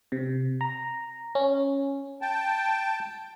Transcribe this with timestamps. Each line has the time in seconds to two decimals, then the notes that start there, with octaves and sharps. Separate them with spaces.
0.12 C3
0.61 A#5
1.35 C#4
2.22 G5 A5